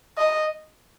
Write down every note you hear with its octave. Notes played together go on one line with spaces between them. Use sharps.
D#5